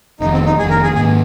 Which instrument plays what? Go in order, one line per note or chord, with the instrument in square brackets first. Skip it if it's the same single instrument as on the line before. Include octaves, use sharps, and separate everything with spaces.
[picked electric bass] F1 F2 D#3 [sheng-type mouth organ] D#4
[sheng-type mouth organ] C4
D#4
[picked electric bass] F1 F2 D#3 [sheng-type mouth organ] G#4
[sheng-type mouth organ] A#4
G#4
[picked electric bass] G#2 D#3 A#3 [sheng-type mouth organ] G#4